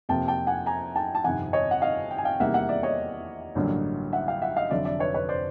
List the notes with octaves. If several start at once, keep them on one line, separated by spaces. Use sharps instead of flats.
F2 C3 F3 A#3 G5 A5
G5 A5
F#5 G#5
G#5 A#5
G5 A5
A5
G1 F2 C3 D#3 F#5 G#5
C#5 D#5
F#5
D#5 F5
G5
G#5
F5 G5
E2 C3 D#3 G3 A#3 E5 F#5
E5 F#5
D5 E5
C#5 D#5
A1 G2 D3 F#3 A#3
E5 F#5
F5 G5
E5 F#5
D#5 F5
F1 F2 D3 F#3 D5 E5
D5 E5
B4 C#5
B4 C#5
C5 D5